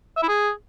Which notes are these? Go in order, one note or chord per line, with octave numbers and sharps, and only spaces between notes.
E5
E4
G#4